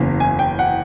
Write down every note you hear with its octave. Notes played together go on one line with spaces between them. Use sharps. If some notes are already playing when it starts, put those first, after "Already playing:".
Already playing: F#1 E2 C#3
G#5
G5
F#5